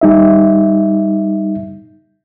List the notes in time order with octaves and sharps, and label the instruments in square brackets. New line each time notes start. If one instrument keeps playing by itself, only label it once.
[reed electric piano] G3 D#4 E5